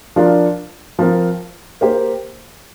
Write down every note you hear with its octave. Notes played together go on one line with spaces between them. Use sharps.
F3 D4 F4 A#4
F3 C4 A#4
A#3 G4 C5